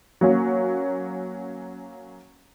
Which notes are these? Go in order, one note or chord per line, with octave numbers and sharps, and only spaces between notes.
F#3 A#3 C#4